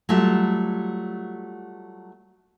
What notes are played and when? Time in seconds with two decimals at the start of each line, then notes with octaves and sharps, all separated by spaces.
0.09 F#3 G3 A3 F4